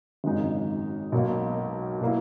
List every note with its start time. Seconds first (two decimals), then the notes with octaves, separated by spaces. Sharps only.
0.24 G#1 F#2 C#3 G#3 D#4
1.12 B1 B2 A#3
2.01 B2 A#3 E4